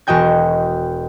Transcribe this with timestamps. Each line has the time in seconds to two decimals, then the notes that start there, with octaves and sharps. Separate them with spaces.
0.07 E1 F#4 D#5 G5 G#6